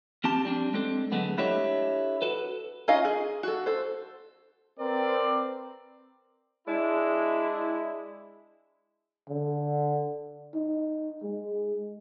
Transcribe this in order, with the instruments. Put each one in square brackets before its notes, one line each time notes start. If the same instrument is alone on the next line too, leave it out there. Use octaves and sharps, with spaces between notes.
[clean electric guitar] F3 C4 G4 A5
G3 C4 D4
G#3 C4 D4 A4
D3 F#3 G#3 A3 B3
D4 E4 G4 A4 C#5 D#5
F#4 A4 B4
[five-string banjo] C#4 D#4 F4 D#5 F5
G#4
F#4 A4
A4 C5
[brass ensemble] C4 A#4 B4 D5
[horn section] G#3 D4 E4
[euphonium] D3
D#4
G#3